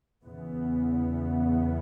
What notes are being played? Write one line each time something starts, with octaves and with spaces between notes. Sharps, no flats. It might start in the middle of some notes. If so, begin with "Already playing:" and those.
E2 C#3 E3 B3